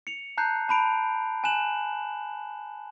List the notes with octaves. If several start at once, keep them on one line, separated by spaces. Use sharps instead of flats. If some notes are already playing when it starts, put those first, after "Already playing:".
C#7 F7
A5 A#5 F#6 G6 C7
A5 B5 D7 F7
G#5 F#6 E7 F#7